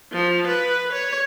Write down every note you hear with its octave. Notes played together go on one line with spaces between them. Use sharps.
F3
B4
C#5